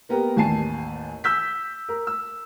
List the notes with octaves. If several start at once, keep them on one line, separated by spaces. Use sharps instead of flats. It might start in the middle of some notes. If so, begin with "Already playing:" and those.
A#3 B3 G4 A#4
A1 D#2 G#5 A5 C7
E6 G6 B6
A#4
E6